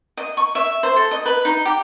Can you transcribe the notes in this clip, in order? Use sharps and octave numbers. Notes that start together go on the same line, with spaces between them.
D#5
C#6
E5
C5
A4
D#5
B4
D#4
G4